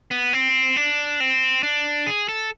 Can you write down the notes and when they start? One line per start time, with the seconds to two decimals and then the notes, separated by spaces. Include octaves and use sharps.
0.11 B3
0.33 C4
0.76 D4
1.20 C4
1.63 D4
2.06 G#4
2.29 A4